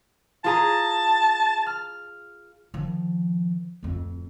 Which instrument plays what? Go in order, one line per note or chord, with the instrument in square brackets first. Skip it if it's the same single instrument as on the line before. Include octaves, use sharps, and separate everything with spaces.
[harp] F4 G#4 A#5 [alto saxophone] A5
[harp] F6
[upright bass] D#3 F3
D1 F2